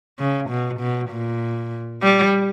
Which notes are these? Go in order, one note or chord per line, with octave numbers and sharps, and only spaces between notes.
C#3
B2
B2
A#2
G3